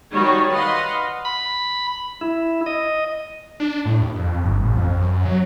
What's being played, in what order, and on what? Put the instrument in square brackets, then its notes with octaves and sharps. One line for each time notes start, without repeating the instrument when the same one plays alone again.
[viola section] D#3 G3 F#4 C#5
B4 D#5 F5 F#5 C6
[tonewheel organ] B5
E4
D#5
[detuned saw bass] D4
A2
D#2
F2
G1
A1
F2
F#2
F#3